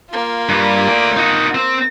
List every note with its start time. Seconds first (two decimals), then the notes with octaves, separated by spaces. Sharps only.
0.11 A#3 F4
0.49 G2 G3
0.88 A3 D5
1.17 D#4 F#4
1.55 C4